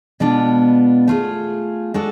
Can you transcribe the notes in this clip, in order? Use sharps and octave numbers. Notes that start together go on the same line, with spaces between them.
B2 G#3 B3 D4 F4
A3 F4 G#4
G#3 D4 F#4 A4